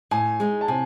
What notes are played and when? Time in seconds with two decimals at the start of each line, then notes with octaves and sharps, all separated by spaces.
0.11 A2 G#5
0.40 G#3 D#4
0.61 A5
0.68 C3 G#5